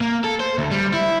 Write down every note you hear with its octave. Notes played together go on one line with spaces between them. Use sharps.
A#3
A4
C5
D2
G3
E4